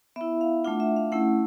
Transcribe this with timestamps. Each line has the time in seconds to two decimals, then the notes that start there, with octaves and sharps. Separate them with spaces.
0.16 B3 E4 E5
0.41 F5
0.64 A3 D4 F4 F#5
0.80 E5
0.96 F5
1.12 A3 C#4 E4 F#5